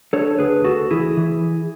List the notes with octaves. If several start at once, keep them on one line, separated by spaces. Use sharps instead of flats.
D4 A4 C#5
D2 G#4 B4
D2 F#4 A4
E3 E4 G#4
E3